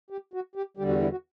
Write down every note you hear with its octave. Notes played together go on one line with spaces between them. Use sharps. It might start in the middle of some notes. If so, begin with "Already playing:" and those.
G4
F#4
G4
E2 D3 G3 G4
F#4
E4
F#4